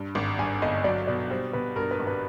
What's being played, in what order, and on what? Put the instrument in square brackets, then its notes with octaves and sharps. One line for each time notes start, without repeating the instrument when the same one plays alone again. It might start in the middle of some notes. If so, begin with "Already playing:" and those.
Already playing: [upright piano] G2
G#1
[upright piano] G2 [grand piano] G#5
[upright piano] G1 [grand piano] D#5
[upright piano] F#3 [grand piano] D5
[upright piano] B2 [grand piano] D5
[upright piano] G3 [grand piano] C5
[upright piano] B2 [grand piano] B4
[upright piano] G2 [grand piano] A#4
[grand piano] B4
[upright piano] G#1
[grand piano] B4